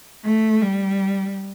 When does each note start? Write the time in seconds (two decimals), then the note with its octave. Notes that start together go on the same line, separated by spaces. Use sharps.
0.25 A3
0.62 G3